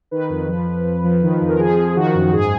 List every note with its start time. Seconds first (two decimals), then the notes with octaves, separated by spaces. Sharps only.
0.11 D#3 B4
0.29 F2
0.48 F3
0.67 F3
0.85 F2
1.04 F3
1.22 D#3
1.41 F2
1.49 A#4
1.59 F3 G#4
1.77 F3
1.96 D#3 F#4
2.14 F#2
2.33 G#2 G#4